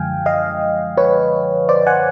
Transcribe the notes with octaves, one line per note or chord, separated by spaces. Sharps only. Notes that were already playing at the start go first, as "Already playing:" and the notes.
Already playing: F#2 D3 F3 G#3 F5 G5 G#5
D#5 F5
B4 C#5
C5 D5
F#5 G#5